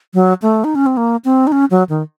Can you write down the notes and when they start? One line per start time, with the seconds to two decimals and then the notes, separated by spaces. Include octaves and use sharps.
0.14 F#3
0.42 A3
0.64 D#4
0.75 C#4
0.86 C4
0.97 A#3
1.25 C4
1.47 D#4
1.52 C#4
1.71 F#3
1.89 D#3